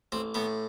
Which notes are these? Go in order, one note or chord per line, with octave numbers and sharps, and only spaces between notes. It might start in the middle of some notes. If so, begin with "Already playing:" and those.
A1 C4
A2 B3